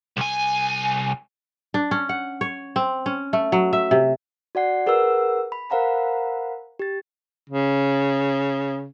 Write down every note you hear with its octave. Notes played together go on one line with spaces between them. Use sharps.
C2 G#5
D4
C#4
F#5
C#5
C4
C#4
A3
F#3
E5
C3
F#4 D5 F#5 C7
G#4 A#4 B4 F#5 E6
B5
A#4 C5 F5 F#5 A#5 B5
G4 A6
C#3